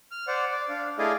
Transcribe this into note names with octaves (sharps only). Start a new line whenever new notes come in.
F6
C5 D5 F#5
D5
D4 F5
A3 E4 G#4 D5 D#5 F5